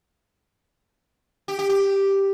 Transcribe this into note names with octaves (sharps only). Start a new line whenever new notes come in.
G4
G4
G4